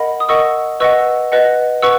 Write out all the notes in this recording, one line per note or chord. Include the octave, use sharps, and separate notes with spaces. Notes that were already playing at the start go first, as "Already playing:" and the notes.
Already playing: A#4 D#5 F#5 B5
D#6
A#4 D#5 F#5 C#6 E6
B4 D#5 F#5 C#6 E6
B4 D#5 F#5
B4 F#5 C#6 E6